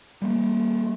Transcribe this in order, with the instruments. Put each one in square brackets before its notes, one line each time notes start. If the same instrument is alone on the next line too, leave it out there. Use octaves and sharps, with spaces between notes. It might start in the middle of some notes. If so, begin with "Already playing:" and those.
[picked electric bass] G3 A#3